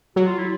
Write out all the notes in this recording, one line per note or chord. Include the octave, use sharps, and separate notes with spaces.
F#3 F#4
F4
E4